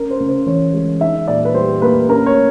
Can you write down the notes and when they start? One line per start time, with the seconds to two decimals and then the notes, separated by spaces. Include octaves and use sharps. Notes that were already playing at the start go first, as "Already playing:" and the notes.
Already playing: C#4 A#4
0.11 C5
0.20 C#3
0.29 C5
0.46 E3 C#5
0.73 G#3
1.01 D#4 E5
1.28 A#2 D5
1.45 B4
1.54 G3 C5
1.82 A#3 B4
2.09 C#4 A#4
2.26 C#5